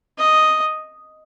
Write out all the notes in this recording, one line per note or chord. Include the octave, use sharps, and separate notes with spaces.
D#5